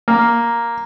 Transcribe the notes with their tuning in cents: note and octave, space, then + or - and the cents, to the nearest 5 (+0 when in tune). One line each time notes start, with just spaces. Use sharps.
A#3 +5